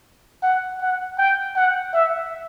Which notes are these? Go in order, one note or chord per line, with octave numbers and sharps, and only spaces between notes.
F#5
F#5
G5
F#5
E5